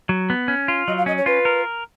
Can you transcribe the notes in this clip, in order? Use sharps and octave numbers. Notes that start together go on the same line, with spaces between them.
F#3
B3
C#4
F4
F#3 D#5
F5
C#4 D#5
C#5
F4 B4
A#4